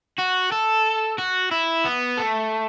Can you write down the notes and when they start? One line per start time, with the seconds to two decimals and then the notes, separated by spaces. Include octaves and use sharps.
0.19 F#4
0.52 A4
1.18 F#4
1.51 E4
1.85 B3
2.18 A3